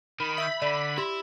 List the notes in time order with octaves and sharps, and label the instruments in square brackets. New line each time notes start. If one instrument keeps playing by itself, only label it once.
[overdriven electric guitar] D#3 [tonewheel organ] B5
[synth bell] E5 E6 G6
[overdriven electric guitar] D3 [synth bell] D5
[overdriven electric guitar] E4 [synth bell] G4 C6